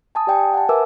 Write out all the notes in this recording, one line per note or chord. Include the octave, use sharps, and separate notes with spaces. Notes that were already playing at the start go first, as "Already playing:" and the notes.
G#5 A5 D#6
G4 D5 G5 G#5
F#5 A5
A#4 B4 E5 G#5 D6 E6